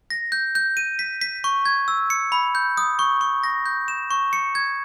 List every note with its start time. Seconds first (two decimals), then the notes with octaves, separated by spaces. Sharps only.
0.10 A#6
0.32 G6
0.55 G6
0.77 D#7
0.99 B6
1.21 B6
1.44 C#6
1.65 G#6
1.88 E6
2.10 C#7
2.32 B5
2.55 G6
2.77 D#6
2.99 C#6
3.21 C#6
3.44 A#6
3.66 G6
3.88 E7
4.11 C#6
4.33 C#7
4.55 G#6